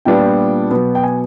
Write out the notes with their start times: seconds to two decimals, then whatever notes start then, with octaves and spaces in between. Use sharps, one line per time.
0.05 A#2 G3 B3 D4 F4 G5
0.70 B2 F#3 B3
0.95 G5
1.03 G#5